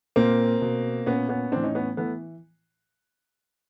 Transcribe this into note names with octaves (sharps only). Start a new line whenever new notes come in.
A#2 A#3 C4
B2
A#2 B3 C#4
B3 C#4
A2 E3 C4 D4
C#4 D#4
B3 C#4
E3 A3 B3